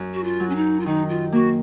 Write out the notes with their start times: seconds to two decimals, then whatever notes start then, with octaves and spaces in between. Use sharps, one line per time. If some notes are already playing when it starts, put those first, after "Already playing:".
Already playing: F#2
0.14 F#4
0.24 F4
0.40 F#3
0.49 C#4
0.56 D#4
0.80 F4
0.86 D#3 D#4
1.09 F4
1.32 A#3 F#4